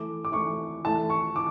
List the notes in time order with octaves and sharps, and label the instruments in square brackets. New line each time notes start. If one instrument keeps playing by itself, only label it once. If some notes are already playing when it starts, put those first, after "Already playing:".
Already playing: [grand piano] E3 A3 E4 [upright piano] D6
[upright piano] D6
[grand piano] E3 A3 E4 [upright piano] C#6
[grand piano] E3 A3 E4 [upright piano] A5
[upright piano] C#6
[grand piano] E3 [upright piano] D6